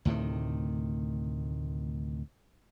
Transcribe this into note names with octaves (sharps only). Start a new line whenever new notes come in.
D2 A2 C3 D#3